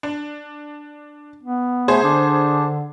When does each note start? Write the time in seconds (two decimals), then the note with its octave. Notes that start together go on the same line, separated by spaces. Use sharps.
0.03 D4
1.43 B3
1.88 A3 G#4 C5 G#6
2.04 D3 D4